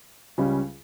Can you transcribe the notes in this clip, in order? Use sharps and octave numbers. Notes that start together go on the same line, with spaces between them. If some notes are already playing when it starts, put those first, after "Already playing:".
C#2 C#3 G3 C#4